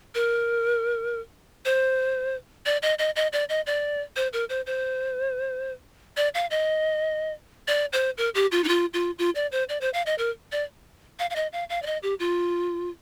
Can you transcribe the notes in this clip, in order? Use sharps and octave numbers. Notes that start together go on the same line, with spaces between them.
A#4
C5
D5
D#5
D#5
D#5
D5
D#5
D5
C5
A#4
C5
C5
D5
F5
D#5
D5
C5
A#4
G4
F4
D#4
F4
F4
F4
D5
C5
D5
C5
F5
D#5
A#4
D5
F5
F5
D#5
F5
F5
D5
D#5
G4
F4